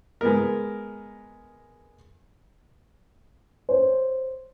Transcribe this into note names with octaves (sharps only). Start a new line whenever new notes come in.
G#3 B3 A#4
C5 C#5